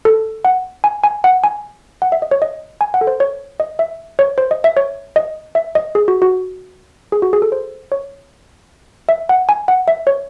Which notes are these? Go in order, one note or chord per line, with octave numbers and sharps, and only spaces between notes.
A4
F#5
G#5
G#5
F#5
G#5
F#5
E5
D#5
C#5
D#5
G#5
F#5
A4
C5
C#5
D#5
E5
C#5
C5
D#5
E5
C#5
D#5
E5
D#5
G#4
F#4
F#4
G#4
F#4
G#4
A4
C5
C#5
E5
F#5
G#5
F#5
E5
C#5